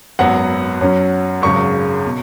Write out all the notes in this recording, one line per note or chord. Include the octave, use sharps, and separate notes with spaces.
G#1 F#2 F#3 B3 F#5
F#2 F#3 C#4
G#1 F#2 C#3 G#3 C#6
B2